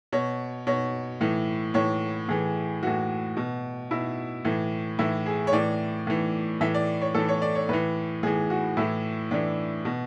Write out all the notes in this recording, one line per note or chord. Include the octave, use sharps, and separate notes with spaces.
B2 C#5
B2 C#5
A2 E3
A2 E3 C#5
A2 E3 G#4
A2 E3 F#4
B2
B2 E4
A2 E3
A2 E3 E4
G#4
C#5
A2 E3 D5
A2 E3
A2 E3 E5
D5
C#5
A2 E3 A4
C#5
D5
C#5
A2 E3 B4
A2 E3 G#4
F#4
A2 E3 E4
A2 E3 D4
B2